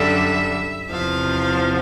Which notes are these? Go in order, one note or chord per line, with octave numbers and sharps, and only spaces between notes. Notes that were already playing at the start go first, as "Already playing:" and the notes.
Already playing: F#2 D3 G3 E5
E2 C3 F3 F5